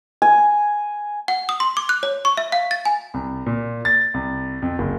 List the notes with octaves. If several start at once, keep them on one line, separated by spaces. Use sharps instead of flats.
G#5
F#5
D#6
C6
D6
F#6
C#5
C#6
E5
F5
A6
G#5
C2
A#2
A6
C2
F2
F#1